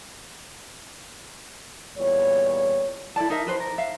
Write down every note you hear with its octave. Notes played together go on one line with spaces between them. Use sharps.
E2 A#2 G3 C#5
E4 A4 D5 A5
D#4 A#4 E5
G4 B4 C5
A#4
E5 F5